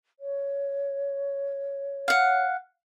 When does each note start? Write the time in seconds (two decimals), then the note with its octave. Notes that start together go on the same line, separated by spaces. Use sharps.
0.19 C#5
2.08 F5 F#5